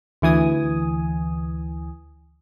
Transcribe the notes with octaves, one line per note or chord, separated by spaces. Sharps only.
D2 E3 G#5 D#6